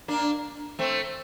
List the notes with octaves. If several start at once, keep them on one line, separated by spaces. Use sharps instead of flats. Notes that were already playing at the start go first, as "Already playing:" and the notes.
A#3 D4
A3 C4